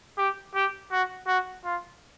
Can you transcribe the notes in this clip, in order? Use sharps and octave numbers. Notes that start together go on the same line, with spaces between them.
G4
G4
F#4
F#4
F4